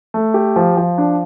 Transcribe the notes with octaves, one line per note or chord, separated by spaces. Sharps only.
A3
G4
F3
F3
D4